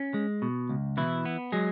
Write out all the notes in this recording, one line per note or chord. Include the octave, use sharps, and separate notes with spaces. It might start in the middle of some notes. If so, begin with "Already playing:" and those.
Already playing: C#4
G#3
B2
C#2
B2 E3 E4
B3
F#3 G#3 G#4